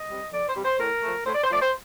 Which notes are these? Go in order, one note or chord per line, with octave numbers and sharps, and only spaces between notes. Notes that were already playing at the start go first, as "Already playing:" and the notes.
Already playing: D#5
C3 G3
F2 D5
C5
C3 G3
C5
A2 A#4
F3 A3
A2 C5
D5
C5
F3 A3 D5
C5